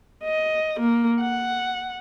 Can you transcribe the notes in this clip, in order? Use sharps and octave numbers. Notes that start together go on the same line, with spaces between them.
D#5
A#3
F#5